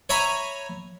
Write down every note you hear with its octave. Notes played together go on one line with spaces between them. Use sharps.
C#5 E5 G#5 A#5 B5